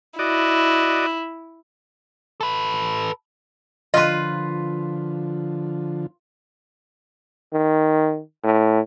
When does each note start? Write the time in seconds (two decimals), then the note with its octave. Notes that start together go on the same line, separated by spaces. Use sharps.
0.19 E4 F#4 D5 D#5
2.41 A4 B4
3.94 D3 F3 F4 B4 D#5 C6
7.53 D#3
8.44 A2